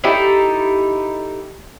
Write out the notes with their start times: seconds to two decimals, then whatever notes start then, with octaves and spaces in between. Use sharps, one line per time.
0.04 D#4 E4 G4 A4